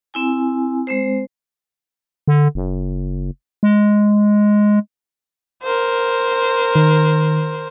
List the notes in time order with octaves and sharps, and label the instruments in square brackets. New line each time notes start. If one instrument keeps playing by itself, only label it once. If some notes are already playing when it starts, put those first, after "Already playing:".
[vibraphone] C4 E4 G#5
G#3 C4 C5
[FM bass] D3
F#1
G#3
[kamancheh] A#4 C5
[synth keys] D#3